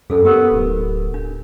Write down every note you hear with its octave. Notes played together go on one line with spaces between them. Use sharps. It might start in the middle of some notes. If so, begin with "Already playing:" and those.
F#2 G#4 A4
B3 G4 A#4 D5
D1
D4